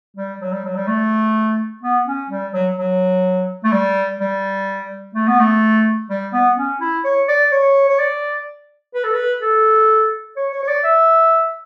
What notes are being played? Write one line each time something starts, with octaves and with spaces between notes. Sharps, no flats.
G3
F#3
G3
F#3
G3
A3
B3
C#4
G3
F#3
F#3
A3
G3
G3
A3
B3
A3
G3
B3
C#4
E4
C#5
D5
C#5
C#5
D5
B4
A4
B4
A4
C#5
C#5
C#5
D5
E5